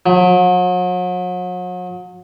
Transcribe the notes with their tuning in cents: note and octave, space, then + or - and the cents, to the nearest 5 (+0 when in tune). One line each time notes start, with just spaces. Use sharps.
F#3 -40